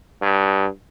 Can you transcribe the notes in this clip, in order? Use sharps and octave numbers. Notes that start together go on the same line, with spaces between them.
G2